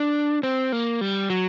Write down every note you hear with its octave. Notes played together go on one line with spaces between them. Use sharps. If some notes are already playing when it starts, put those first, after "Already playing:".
Already playing: D4
C4
A#3
G3
F#3